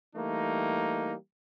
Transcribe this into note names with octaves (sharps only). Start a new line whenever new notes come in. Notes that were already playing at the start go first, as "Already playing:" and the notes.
E3 G3 A3 A#3 D#4